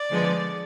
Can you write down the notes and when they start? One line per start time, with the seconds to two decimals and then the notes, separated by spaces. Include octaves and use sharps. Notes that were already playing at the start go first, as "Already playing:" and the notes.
Already playing: D5
0.10 D3 F3 G#3 B3